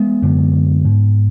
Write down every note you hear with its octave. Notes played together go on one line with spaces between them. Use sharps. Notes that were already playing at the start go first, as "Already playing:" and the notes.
Already playing: G#3 B3
F#2 D3
G#2